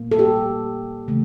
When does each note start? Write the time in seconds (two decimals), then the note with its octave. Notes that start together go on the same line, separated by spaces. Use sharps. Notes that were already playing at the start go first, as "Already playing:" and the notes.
Already playing: A#2 F3 A#3
0.11 A4
0.19 G4
1.08 C#3 E3 A3